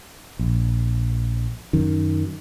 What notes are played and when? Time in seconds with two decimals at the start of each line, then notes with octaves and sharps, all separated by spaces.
0.39 A#1
1.73 F#2 D#3